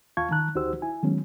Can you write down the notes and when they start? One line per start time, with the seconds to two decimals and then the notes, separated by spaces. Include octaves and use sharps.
0.17 D#2 F4 F5 A5 C#6 G#6
0.31 D#3 A5 A#5 F#6
0.55 D2 D#4 F#4 G4 C5 E6
0.82 E4 G#5
1.03 D#3 F#3 G#3 B3 C#4